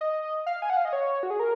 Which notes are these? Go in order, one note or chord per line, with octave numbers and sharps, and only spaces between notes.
D#5
F5
G#5
F#5
F5
D#5
C#5
F#4
G#4
A#4